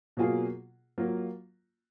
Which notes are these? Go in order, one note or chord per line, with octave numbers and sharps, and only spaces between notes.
B2 F#3 A#3 F4 G#4
F#3 A#3 F4